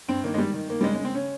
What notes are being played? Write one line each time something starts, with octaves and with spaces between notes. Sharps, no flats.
G2 C4
D#3 A#3
G#3
D#3 G3
D#3
D#3 A#3
G3
C#3 G#3
G#3
C#3
C4
C#3 C#4